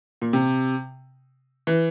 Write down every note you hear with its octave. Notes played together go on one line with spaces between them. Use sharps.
A#2
C3
E3